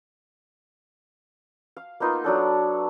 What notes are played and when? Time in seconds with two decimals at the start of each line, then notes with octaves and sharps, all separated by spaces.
1.77 F5
2.00 A#3 B3 D#4 F4
2.24 F#3 D4 A4